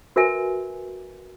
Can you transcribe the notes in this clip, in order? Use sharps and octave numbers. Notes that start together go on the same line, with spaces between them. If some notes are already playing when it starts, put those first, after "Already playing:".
F#4 A#4 B4 E5 G#5